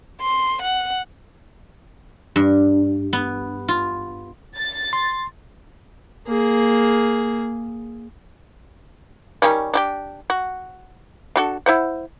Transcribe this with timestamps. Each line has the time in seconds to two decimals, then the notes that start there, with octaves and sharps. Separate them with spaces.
0.21 C6
0.62 F#5
2.36 G2
3.13 B3
3.68 F4
4.57 A6
4.93 C6
6.27 A#3 G#4
9.42 D#3 G3 C#4
9.74 D4 F#4 G4
10.30 F#4
11.36 D4 F#4 A4
11.66 E4 C5 F#5